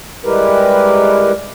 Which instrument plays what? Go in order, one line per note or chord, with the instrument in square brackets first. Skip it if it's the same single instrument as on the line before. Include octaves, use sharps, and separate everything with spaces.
[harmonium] G3 G#3 E4 G4 A#4 B4